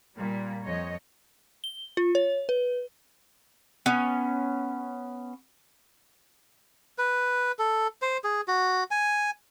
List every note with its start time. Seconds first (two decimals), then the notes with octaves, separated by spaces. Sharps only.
0.17 A#2 G3 A#3
0.63 F2 C#5 D#5
1.64 G7
1.97 F4
2.15 C#5
2.49 B4
3.86 B3 C#4
6.98 B4
7.59 A4
8.02 C5
8.24 G#4
8.48 F#4
8.91 G#5